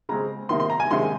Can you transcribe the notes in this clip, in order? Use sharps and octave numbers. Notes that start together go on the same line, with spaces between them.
C#3 G#3 C4 A#5
C3 D#3 A#3 C6
C6
A#5
G#5
C3 D#3 G#3 C#4 C6